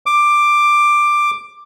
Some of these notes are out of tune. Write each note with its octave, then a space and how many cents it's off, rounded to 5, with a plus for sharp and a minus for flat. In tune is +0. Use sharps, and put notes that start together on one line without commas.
D6 +10